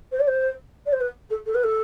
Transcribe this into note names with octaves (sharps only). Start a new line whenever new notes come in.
C5
D5
C5
D5
C5
B4
A4
A4
B4
A4